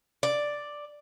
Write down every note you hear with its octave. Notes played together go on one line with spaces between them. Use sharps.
D5